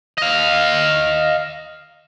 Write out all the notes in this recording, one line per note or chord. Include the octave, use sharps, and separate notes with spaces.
D#5 F5